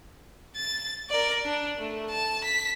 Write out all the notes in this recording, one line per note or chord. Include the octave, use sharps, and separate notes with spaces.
A6
A#4 D5
D4
A3
A5
B6